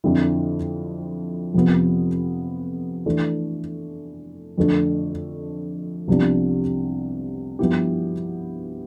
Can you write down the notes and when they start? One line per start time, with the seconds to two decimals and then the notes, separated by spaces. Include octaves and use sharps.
0.04 F2 D3 F3 C4 E4
1.54 F2 C3 F3 B3
3.06 E3 A3 D4
4.58 F2 D3 A3 D4
6.07 C2 C3 F3 B3 D4
7.59 G2 F3 B3 E4 G4